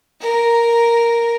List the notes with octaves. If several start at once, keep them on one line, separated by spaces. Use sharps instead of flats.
A#4